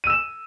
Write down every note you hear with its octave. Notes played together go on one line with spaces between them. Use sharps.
E6 D#7 E7